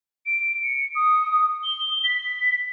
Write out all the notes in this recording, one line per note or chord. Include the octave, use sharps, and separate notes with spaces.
D7
C#7
D#6
G7
B6